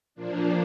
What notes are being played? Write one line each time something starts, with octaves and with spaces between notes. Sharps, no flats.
A#2 F3 A#3 D4